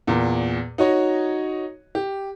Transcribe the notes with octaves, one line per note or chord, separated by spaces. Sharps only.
E2 A#2
D#4 F#4 C#5 D#5
G4